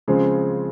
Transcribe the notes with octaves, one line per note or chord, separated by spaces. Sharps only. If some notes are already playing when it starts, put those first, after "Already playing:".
C#3 F3 G#3 C4